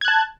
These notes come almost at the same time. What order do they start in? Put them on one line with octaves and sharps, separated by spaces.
G#6 F#6 A5